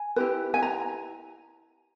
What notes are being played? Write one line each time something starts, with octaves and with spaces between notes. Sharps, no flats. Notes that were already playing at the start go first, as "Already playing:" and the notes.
Already playing: G#5
E4 G4 B4
G#5
A#5